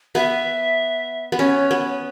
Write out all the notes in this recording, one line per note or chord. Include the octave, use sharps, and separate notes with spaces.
B3 E5
B3
C#4 C#5
B3